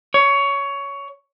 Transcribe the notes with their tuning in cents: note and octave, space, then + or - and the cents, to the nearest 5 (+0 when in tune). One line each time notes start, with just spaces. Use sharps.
C#5 +15